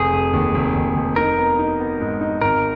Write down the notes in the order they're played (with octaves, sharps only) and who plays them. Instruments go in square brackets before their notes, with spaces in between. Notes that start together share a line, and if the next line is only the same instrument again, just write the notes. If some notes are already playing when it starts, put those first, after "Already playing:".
Already playing: [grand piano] F1 [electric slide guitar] G#4
[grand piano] F1
D#2
F1
D#2
F1
[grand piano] D#4 [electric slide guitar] A#4
[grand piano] B3
D#4
B3
G#2
D#4
[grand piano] G#1 [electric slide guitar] A#4